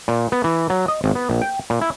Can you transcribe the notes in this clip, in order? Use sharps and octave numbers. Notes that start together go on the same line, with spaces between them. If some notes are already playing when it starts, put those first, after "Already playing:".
A#2
B3
E3
F#3
D#5
G#1
B3
A#1
G5
A#2
E4